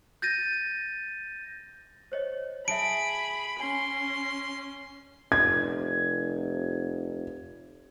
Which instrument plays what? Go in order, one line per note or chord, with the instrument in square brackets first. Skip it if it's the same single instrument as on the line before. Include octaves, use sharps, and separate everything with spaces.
[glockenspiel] G6 A6 A#6 D#7
[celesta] C5 C#5 D#5
[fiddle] G#4 [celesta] E5 A5 [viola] B5 [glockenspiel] D7
[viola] C#4 [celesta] G#5 [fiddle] C6
[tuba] F1 [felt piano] G#6